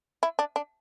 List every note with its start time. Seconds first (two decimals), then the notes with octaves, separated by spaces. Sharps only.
0.23 E4
0.39 D4
0.56 D4